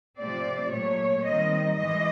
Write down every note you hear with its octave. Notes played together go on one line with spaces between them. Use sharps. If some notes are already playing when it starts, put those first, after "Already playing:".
C3 F3 A3 C4 D5
A#2 F#3 A3 C#5
D#3 G3 C4 D#5
E3 G#3 D#5